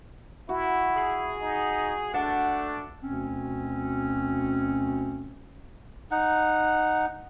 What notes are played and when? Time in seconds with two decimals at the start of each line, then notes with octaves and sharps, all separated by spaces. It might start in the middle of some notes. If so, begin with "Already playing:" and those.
0.49 E4 F#4
0.96 G#4
1.41 D#4
2.14 A3 D4 F#5
3.03 D2 B2 C4 C#4
6.11 D#4 F#5